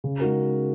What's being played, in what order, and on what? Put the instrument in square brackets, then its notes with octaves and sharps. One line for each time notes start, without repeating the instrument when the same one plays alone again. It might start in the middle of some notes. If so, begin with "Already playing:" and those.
[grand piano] C#3
G#3 D#4 F#4 A#4